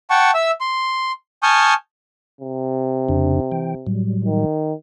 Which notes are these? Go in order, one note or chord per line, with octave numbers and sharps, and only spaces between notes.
F#5 G5 A5 C#6
E5 E6
C6
G#5 A5 C#6 D#6 F6 G6
C3
F2 C#3 D4
E3 G5
A2 F#3 G3
D#3